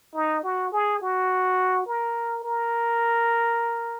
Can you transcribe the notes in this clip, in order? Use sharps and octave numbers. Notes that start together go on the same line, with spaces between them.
D#4
F#4
G#4
F#4
A#4
A#4